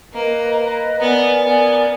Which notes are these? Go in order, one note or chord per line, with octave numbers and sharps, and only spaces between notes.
A#3 B4 D#5 A#5
B4 D#5 A#5
B3 A#4 D5 G#5
B3 A#4 D5 G#5